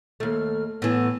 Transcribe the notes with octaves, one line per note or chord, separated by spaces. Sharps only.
D#2 A3 F6
A2 E3 B3